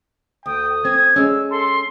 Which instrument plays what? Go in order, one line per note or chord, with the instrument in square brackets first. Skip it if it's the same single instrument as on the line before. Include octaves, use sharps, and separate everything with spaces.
[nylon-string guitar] D2 [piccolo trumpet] G5 [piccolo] D#6
[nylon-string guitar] C4 [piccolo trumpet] G#6
[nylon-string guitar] G#3 C#4 [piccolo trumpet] E6
[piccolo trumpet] A4 [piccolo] C6